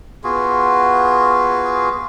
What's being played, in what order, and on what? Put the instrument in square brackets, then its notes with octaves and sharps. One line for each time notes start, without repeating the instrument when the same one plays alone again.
[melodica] B3 F4 F#4 G#4